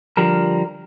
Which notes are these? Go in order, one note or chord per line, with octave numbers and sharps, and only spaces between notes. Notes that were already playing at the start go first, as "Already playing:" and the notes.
D3 F3 G3 A#4